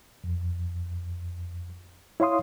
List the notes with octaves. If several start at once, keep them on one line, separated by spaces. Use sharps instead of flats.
F2
E4 C#5 F5 C6 D#6